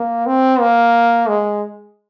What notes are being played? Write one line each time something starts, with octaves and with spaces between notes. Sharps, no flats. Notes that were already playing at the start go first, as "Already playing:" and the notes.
Already playing: A#3
C4
A#3
G#3